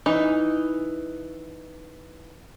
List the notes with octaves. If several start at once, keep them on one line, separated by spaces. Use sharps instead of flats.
E3 D#4